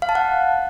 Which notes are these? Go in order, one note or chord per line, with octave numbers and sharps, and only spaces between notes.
F5
A5
F#5